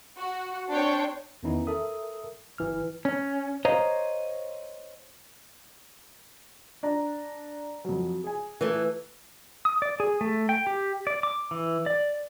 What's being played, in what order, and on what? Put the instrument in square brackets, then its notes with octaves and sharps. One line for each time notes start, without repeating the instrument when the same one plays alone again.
[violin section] F#4
C4 D4 C#5 G5
[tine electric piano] E2 D#3 B3 C#4 D#4 E4
A4 A#4 E5 D#6
G1 E3 F6
[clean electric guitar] C#4
C5 C#5 D#5 F5 A#5
[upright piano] D4 D5 A#5
F2 F#3
G#4 G#5
[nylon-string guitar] E3 A3
[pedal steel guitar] D#6
D5
G#4
A3
G5
G4
D5
D6
E3
D5